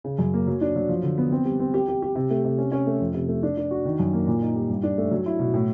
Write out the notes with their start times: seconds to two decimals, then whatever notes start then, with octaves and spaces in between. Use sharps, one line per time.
0.04 C#3
0.19 F#2
0.34 A#3
0.47 F#3
0.61 D4
0.76 F#3
0.89 F3
1.03 D3
1.18 B3
1.32 C4
1.45 G3
1.60 C4
1.74 G4
1.88 G4
2.02 G4
2.15 C3
2.30 A3
2.44 C3
2.58 C#4
2.72 C#4
2.87 A3
3.00 F2
3.14 C3
3.28 A3
3.43 D4
3.57 D4
3.71 F#4
3.85 D#3
3.99 F#2
4.13 A#3
4.27 A#2
4.41 D#4
4.55 G3
4.70 G2
4.83 D4
4.98 A3
5.11 F#3
5.26 E4
5.39 B2
5.54 A2